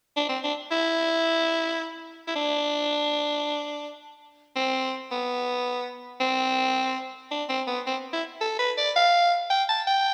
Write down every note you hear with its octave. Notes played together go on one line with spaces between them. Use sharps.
D4
C4
D4
E4
E4
D4
C4
B3
C4
D4
C4
B3
C4
E4
A4
B4
D5
F5
G5
A5
G5